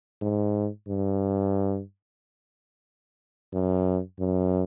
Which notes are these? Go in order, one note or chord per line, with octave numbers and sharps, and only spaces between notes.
G#2
G2
F#2
F#2